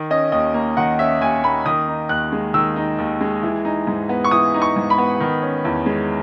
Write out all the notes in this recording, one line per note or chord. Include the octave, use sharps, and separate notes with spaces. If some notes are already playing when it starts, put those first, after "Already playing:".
Already playing: D#3
C#4 D#5
D#2 D#5
A#3
D#3 F#5
C#4 E5
D#2 G#5
A#3 B5
D#3 D#6
D#4
D#2 F#6
G#3
D#3 E6
D#4
D#2
G#3
E3
D#4
G#2
B3
C#6
E3 D#6
D#4
C#6
G#2
B5
B3
D#3
C#4
E2
G#3